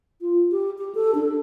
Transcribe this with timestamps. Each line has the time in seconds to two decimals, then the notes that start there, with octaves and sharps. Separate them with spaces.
0.21 F4
0.52 G4
0.78 G4
0.95 A4
1.15 D4